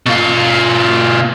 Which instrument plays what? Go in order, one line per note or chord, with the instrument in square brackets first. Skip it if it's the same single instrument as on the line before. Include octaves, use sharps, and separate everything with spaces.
[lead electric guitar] B2 F4